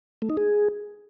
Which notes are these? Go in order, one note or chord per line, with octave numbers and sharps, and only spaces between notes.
A3
D#4
G#4